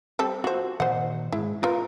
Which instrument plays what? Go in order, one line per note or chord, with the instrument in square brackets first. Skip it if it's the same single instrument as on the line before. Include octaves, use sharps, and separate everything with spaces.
[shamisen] G3 C4 A4
[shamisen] F4 C5 [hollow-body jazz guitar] F#4
[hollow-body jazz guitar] A#2 D#3 D#5 [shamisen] C5 F#5
[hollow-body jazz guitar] G#2 G#3 [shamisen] E4
[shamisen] F4 B4 [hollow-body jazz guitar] A#4